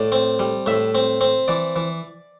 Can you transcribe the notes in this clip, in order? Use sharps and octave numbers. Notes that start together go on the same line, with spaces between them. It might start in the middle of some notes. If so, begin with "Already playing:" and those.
Already playing: A2 D5
C4
G3
A2 E5
C4
C4
E3 D5
E3